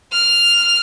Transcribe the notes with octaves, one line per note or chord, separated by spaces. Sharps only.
F6